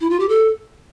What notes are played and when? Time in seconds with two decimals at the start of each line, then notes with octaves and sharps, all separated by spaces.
0.01 E4
0.10 F4
0.20 G4
0.29 A4